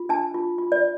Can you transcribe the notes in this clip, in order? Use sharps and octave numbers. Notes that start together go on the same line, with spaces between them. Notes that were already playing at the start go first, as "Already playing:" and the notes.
Already playing: F4
D4 A5
F4
F4
D5